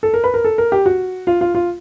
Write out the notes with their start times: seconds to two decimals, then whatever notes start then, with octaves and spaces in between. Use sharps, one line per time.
0.03 A4
0.14 A#4
0.24 B4
0.34 A#4
0.45 A4
0.58 A#4
0.72 G4
0.86 F#4
1.27 F4
1.41 F4
1.55 F4